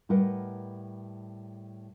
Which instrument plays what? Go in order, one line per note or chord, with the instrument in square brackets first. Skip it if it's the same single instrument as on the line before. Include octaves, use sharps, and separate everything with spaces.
[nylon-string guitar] A2 G3 A#4 B4 D#5 F#5